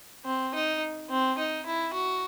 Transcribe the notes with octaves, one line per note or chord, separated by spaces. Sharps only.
C4
D#4
C4
D#4
E4
F#4